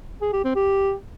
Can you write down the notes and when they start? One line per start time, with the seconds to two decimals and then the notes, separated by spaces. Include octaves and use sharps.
0.22 G#4
0.33 G4
0.44 C4
0.55 G4